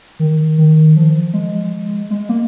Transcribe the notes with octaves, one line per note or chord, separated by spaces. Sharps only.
D#3
D#3
F3
G#3
G#3
A#3